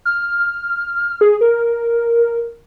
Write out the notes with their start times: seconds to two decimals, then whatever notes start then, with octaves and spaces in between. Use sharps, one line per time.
0.05 F6
1.21 G#4
1.41 A#4